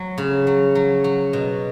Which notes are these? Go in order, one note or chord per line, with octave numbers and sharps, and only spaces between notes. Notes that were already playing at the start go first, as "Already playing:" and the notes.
Already playing: F#3
C#3
F#3
F#3
F#3
B2